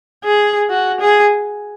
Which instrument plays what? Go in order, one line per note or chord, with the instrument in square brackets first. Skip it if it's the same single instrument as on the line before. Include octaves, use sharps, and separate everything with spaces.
[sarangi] G#4
F#4
G#4